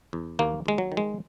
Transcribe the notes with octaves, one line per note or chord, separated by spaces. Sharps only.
E2
D#2 A#3
D#2 G#3
F#3
D#3
G#3